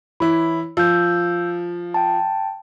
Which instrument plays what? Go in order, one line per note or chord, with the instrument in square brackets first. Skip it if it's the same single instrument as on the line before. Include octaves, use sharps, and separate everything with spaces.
[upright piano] E3 E4 [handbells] C#5 B5
[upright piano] F3 [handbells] E6 G6
[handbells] G5 A5